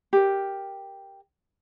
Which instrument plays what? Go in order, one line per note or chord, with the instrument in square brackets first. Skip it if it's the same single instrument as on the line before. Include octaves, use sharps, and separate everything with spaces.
[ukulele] G4 A#4